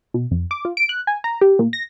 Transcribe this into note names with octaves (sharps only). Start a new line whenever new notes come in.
B2
F2
D6
F4
D7
F#6
G#5
A#5
G4
A#2
A#6